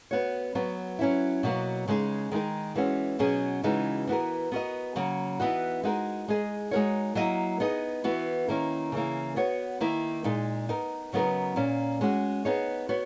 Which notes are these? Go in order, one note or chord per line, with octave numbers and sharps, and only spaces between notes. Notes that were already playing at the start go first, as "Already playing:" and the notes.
B3 F#4 C#5
F#3 B3 F#4
F#3 C#4 E4
B2 F#3 A#3
C#3 G#3 D#4 G#4
D#3 G#3 D#4 A#4
E3 G#3 C#4 F#4
B2 F#3 C#4 G#4
C#3 E3 G#3 D#4 F#4
E3 B3 F#4 A#4
B3 F#4 A#4 D#5
C#3 F#3 A#3
E3 B3 D#4 F#4
G#3 D#4 F#4 A#4
G#3 D#4 G#4 D#5
G#3 D#4 F#4 A#4 C#5
F#3 A#3 E4 A#4 D#5
B3 D#4 G#4 D#5
E3 B3 F#4
D#3 A#3 C#4 E4 A#4
C#3 E3 A#3
B3 F#4 C#5
D#3 A#3 E4
A#2 G#3 D#4
B3 D#4 A#4
C#3 F#3 B3 D#4 A#4
A#2 A#3 C#4
G#3 C#4 F#4
B3 D#4 G#4 C#5
B3 F#4 C#5